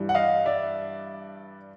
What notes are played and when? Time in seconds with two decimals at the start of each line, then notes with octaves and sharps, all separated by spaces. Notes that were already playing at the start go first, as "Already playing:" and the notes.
Already playing: G2 E3
0.09 F#5
0.15 D#5 F5
0.46 D5 E5